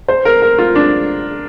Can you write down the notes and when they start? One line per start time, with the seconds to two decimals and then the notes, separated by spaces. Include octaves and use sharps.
0.08 C5
0.25 A#4
0.42 A#4
0.58 F4
0.75 D4